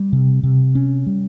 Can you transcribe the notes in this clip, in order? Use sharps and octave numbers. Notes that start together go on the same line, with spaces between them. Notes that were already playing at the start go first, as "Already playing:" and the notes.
Already playing: G3
C3
C3
C#4
G3